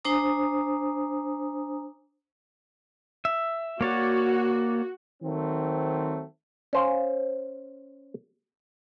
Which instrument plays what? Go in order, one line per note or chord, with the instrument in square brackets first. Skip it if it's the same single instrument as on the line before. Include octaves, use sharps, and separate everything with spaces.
[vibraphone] D4 C5 G#5 A#5 D#6
[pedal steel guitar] E5
[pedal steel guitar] A#3 C#5 D5 [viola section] F#4
[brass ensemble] D#3 F#3 A3 C4
[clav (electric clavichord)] C#4 C5 F5